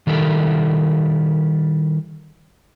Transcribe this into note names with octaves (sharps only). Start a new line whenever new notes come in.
D#3 G3 E4 A4 A#4